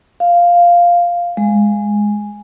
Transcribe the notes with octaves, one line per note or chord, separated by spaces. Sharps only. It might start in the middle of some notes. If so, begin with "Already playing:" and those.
F5
G#3